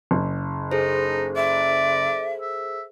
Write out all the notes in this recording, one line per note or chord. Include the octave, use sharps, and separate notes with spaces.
F#1
D#4 G#4 A4 C5
D5 E5
E5